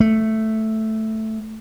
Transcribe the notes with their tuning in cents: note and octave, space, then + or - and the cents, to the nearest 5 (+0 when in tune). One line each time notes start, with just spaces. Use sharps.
A3 +0